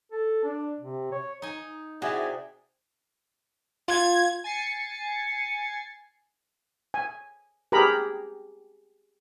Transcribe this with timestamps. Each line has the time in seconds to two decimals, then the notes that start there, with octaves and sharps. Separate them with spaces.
0.12 A4
0.44 D4
0.80 C3
1.12 C#5
1.42 D#4 G#5
2.02 C3 E4 F#4 G#4 D5 G#5
3.88 F4 G#6
4.44 G#5 A6 C7 C#7
6.94 G#5
7.72 G4 G#4 A#4 A#5 B5